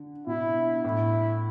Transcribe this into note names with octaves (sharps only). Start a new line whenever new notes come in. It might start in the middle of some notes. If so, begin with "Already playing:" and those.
Already playing: D3
B2 E4
A2 E4